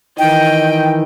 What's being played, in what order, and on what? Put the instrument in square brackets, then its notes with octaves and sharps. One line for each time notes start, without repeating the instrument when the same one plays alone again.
[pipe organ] D#3 E3 [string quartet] D#5 [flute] G5